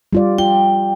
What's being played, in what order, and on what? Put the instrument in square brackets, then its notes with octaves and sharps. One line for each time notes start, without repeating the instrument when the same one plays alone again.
[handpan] G3 F4 D5
[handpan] F4 [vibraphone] G5